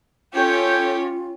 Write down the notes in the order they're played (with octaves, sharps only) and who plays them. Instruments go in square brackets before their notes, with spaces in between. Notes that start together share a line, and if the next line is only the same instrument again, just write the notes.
[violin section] C#4 C#5 [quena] F4 [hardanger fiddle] G4 [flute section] A4 G5 G6